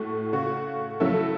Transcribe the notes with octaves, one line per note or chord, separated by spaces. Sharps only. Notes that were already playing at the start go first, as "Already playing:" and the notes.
Already playing: A2 A3 F#4
C#3 A3 F#4
C#3 F#3 A3 E4 A4